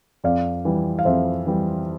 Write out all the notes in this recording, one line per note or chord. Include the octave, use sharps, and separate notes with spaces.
F2 D5 F5
E3 G3
F5
F2 C5 E5
E3 G3